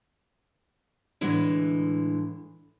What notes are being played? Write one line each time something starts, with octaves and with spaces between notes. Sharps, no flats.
A2 D3 E3 G#3